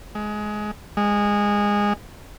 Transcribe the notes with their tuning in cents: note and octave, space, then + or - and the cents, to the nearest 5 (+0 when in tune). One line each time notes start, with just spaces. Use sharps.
G#3 +20
G#3 -15